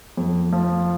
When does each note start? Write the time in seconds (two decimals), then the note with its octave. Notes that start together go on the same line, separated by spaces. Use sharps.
0.17 F2
0.53 F3